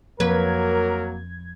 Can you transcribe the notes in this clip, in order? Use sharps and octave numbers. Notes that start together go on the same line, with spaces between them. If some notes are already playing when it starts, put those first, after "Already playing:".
F2 F#3 A#3 A#4 B4 G#6